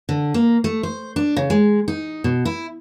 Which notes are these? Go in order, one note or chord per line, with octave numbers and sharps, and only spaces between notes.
D3
A#3
A3
C5
D4
C#3
G#3
D#4
B2
E4